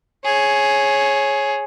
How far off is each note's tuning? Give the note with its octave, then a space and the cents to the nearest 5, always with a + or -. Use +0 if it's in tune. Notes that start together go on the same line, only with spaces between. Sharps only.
G#4 +10 C#5 -10